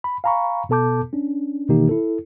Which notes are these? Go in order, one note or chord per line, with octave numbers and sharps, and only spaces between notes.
B5
F5 G#5 A#5 B5 C#6
B2 B3 A4 A5 D6 G6
C#4 D4
B2 D#3 E3 A#3 D#4 G4
E4 A4